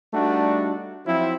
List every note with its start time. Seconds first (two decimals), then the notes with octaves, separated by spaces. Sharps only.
0.14 G3 A3 D4 D#4 F#4
1.06 F3 F#3 C4 E4